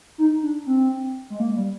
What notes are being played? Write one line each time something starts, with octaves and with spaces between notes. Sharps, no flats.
D#4
D4
C4
G#3
A#3
G3